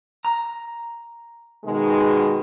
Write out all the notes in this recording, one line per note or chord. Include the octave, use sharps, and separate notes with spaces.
A#5
B2 D#3 G#3